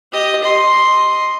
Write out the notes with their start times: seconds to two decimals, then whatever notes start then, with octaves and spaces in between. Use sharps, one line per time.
0.12 G4 D#5
0.44 D#5 C6